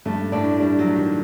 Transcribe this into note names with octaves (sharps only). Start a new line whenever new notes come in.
G2 A3
A2 D4
G3 D4
F#3
A3
D#3